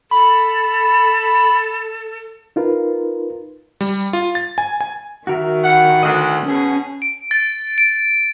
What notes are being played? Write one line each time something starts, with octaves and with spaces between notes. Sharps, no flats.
A4 B5
D#4 F4 A#4 B4
G3
F4
A6
G#5
G#5
D#3 F#4 A#4 E5
E4 G4 F#5
D2 D#5 F#5
B2 C#4 G#4
D7
A6
D7